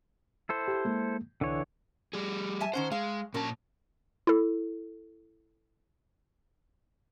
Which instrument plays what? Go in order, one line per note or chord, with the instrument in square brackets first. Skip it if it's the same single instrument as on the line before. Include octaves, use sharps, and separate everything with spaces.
[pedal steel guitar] E4 A4 C5
[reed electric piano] G4
G#3 A#3
[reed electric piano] C2 [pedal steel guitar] D3 E3 C#5
[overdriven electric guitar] G3 G#4
[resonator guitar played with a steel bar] E5 G#5 A5
[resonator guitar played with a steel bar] D#3 C#4 F#5 [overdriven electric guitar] C5
[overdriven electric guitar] G#3 [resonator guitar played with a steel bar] F5
[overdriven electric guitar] A#2 A5 [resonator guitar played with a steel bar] F#3 C#4 A#4
[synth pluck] E4 A4